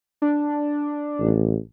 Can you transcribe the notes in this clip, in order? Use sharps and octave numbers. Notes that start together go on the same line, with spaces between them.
D4
A1